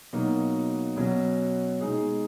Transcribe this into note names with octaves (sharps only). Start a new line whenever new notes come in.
B2 F#3 A#3 D#4
B2 F#3 C#4
B2 G#3 D#4 G#4